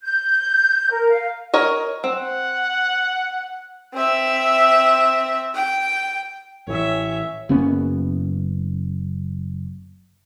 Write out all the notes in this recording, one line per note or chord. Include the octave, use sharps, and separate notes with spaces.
G6
A#4
F5
A#4 C#5 D#5
C4 F#5
C4 E5
G5
A1 E3 C#5 E5
F#1 A#3 B3 C#4